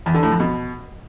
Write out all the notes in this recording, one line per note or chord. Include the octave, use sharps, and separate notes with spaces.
E2
D3
A2
F2
B2